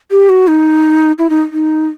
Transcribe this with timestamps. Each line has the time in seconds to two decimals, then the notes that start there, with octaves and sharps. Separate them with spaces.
0.11 G4
0.29 F#4
0.48 D#4
1.19 E4
1.30 D#4
1.52 D#4